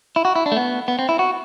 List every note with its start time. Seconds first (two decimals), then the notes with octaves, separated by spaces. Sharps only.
0.16 E4
0.25 F#4
0.36 E4
0.46 D4
0.52 A3
0.57 B3
0.88 B3
0.99 C4
1.09 E4
1.19 F#4